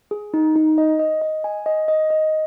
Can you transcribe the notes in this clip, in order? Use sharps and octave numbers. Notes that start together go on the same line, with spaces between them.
G#4
D#4
D#4
D#5
D#5
D#5
G#5
D#5
D#5
D#5